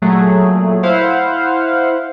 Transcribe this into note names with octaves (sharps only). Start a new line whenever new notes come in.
A#2 F#3 A3 G#4
E4 C5 F5 F#5